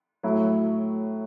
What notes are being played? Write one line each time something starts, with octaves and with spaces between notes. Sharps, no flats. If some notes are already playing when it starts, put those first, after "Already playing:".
A2 F#3 A3 E4